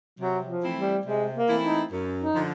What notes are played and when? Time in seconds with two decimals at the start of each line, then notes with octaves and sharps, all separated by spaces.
0.19 C3 F#3
0.48 F3
0.63 E3 A3 C4 E4
0.77 G3
1.06 C3 G#3
1.35 A#3
1.49 E3 A3 C4 E4
1.63 D#4
1.92 F#2
2.21 D#4
2.35 D3 F3